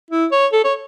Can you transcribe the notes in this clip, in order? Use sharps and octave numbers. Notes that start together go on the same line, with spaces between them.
E4
C#5
A4
C#5